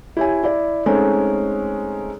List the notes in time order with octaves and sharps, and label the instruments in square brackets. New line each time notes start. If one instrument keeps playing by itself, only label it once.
[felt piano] E4 G4 C#5 G#5
E4 D5
G#3 A3 C4 C#4 D#4